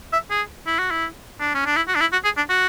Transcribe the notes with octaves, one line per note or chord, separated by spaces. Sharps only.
E5
G#4
E4
F#4
E4
D4
C#4
D4
E4
F#4
D4
E4
F#4
G#4
D4
F#4